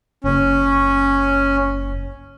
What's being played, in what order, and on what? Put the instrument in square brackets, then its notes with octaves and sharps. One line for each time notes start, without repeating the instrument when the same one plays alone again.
[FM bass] F#1 [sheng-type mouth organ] C#4